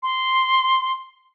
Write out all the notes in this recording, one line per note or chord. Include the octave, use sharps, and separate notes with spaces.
C6